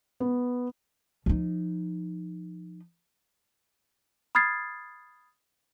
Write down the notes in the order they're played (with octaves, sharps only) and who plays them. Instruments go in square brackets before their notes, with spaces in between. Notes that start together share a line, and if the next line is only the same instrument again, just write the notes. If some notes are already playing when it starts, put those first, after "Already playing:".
[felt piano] B3
[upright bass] F3 D#4
[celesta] B5 D#6 F6 G#6 A6 C7